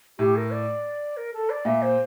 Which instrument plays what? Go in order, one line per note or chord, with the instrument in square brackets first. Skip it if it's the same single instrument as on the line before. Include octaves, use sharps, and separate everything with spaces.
[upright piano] A2 [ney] G4
[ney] A#4
D5
A#4
A4
D5
[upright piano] A#2 [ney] E5
[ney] C5